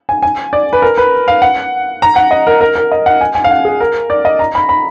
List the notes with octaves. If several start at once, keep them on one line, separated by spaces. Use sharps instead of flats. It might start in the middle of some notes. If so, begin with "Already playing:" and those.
G#5
G#5
D5
B4
A#4
B4
F5
F#5
A#5
F#5
D#5
A#4
A#4
A#4
D#5
F#5
G#5
G#5
F5
F#5
G#4
A#4
D5
D#5
A#5
B5
B5